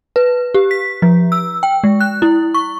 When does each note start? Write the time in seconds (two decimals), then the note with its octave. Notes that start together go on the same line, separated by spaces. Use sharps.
0.16 B4
0.55 G4
0.71 B6
1.02 F3
1.32 E6
1.63 G5
1.84 G#3
2.01 F#6
2.22 E4
2.54 C#6